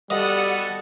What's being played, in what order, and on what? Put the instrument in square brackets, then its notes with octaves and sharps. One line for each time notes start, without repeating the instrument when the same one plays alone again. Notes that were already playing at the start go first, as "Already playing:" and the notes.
[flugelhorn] G3 [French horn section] B3 F#4 A4 [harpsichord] D#5 [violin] F#5